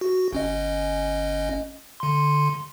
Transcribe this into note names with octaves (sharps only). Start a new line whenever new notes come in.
F#4
G1 C#4 D#5
D3 C6